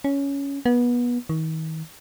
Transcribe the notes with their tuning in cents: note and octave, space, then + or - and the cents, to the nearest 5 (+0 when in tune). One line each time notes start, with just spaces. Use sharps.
C#4 +10
B3 -25
D#3 +40